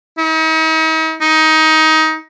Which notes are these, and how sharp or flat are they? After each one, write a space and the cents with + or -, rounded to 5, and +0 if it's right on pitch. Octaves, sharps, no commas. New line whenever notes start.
D#4 +45
D#4 +20